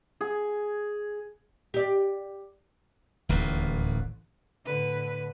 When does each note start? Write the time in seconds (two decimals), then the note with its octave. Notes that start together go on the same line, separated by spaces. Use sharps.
0.21 G#4
1.74 G4 D5
3.29 D1 A1 D#2 A2
4.65 A2 D3 B4